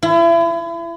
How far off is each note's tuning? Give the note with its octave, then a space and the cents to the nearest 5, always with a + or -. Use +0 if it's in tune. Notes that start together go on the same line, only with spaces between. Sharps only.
E4 +35